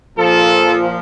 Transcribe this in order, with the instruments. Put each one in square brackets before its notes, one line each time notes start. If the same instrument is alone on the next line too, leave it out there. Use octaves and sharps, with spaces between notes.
[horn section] A#2 F3 A4